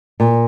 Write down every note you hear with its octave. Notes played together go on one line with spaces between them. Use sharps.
A#2